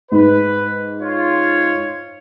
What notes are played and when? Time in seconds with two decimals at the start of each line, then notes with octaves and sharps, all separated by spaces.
0.12 G#2 B4
1.02 F4 C#5